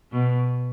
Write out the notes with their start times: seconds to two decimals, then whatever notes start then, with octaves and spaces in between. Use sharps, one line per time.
0.12 B2